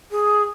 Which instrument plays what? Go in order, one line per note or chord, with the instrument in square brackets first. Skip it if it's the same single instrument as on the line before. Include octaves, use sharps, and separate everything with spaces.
[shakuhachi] G#4